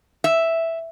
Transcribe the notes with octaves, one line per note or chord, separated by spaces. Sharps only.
E5